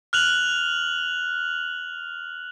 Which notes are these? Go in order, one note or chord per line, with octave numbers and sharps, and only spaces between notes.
F6 F#6 F7 F#7